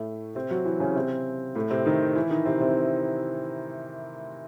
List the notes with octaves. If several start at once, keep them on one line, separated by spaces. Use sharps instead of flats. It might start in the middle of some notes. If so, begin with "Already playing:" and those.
Already playing: A2 A3
C3 C4
F#3 F#4
E3 E4
C#3 C#4
C3 C4
A2 A3
C3 C4
D#3 D#4
E3 E4
D#3 D#4
C3 C4
C3 C4